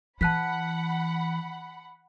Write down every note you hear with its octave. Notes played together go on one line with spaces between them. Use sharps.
E3 F#5 A5 B5 F#6 B6